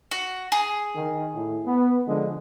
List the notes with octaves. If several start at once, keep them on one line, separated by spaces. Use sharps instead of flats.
F#4
G#4
D#3
A2
B3
D3 F3 G#3